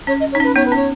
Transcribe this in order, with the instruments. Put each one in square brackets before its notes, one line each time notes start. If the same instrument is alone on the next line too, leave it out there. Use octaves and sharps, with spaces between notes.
[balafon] C#4 [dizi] C#5
[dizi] D#5
C#5
[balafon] D#4
[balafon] C#4 [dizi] B4
[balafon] B3 D#4 [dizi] C#5
[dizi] B4
[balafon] C#4 [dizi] C#5